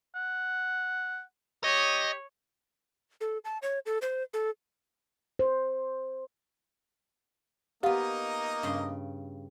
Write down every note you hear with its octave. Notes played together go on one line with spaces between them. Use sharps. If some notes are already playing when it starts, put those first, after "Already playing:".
F#5
G4 C#5 D#5
A4
A5
C#5
A4
C5
A4
C5
A#3 B3 D#4 F4 G4 D#5 F5 F#5
G2 C#3 C6